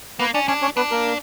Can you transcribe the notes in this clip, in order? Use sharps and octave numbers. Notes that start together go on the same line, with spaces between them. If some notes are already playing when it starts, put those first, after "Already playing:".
A#3 B3 B4
C#4 D4 D5
C#4 D4 C#5
C#4 C#5
B3 D4 B4
A#3 A#4